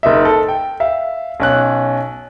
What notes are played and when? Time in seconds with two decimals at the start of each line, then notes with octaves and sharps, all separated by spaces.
0.03 F#1 D#4 E5
0.25 A4
0.48 G5
0.80 E5 F5
1.40 B1 C#4 F#6